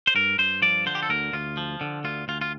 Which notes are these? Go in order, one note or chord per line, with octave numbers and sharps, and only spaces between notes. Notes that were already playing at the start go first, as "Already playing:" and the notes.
C5
G2 A#4
G2 C5
F3 D5
D3 C5
G4
A4
D2 A#4
D2 F4
F3
D3
D2 F4
D2 F4
F4